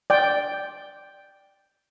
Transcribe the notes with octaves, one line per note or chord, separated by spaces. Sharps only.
D5 G5